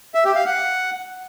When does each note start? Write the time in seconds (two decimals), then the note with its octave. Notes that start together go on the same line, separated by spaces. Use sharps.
0.14 E5
0.25 G4
0.35 F5
0.46 F#5